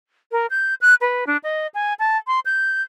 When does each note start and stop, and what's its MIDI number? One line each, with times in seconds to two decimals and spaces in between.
0.32 0.46 70
0.50 0.74 91
0.81 0.94 90
1.01 1.24 71
1.27 1.37 62
1.43 1.67 75
1.74 1.93 80
1.99 2.17 81
2.27 2.40 84
2.45 2.82 91